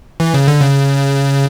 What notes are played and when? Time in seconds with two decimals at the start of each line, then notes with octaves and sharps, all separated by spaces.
0.20 E3
0.34 C#3
0.48 D3
0.61 C#3